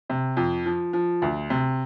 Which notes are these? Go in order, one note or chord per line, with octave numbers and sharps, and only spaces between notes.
C3
F2
F3
F3
D2
C3